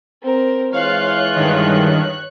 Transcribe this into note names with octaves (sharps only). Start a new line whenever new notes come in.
C4 A#4
E3 G#3 F4 C#5 F5 F#6
G2 D#3